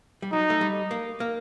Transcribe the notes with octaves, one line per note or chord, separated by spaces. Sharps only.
G3
F#3 D#4
A3
G3
A#3
A#3